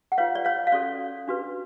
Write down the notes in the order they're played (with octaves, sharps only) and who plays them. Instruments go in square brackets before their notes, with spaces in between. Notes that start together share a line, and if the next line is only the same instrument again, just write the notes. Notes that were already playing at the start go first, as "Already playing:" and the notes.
[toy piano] F#5
F4 B4 C#5 F5
D5
C#5 F5
F5
C#4 F#4 A4 C#5 D5
D4 F#4 B4